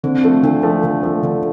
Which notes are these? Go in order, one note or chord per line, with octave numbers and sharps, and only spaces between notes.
D3 C4
F3 A3
D3 D4
F3 A3
D3
F3 A3
D3